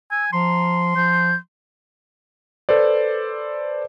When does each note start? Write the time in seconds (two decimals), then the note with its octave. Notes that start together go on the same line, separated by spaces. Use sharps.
0.11 G#5 E6
0.33 F3 A#5 C6
0.96 F3 G6
2.69 A4 B4 C5 D5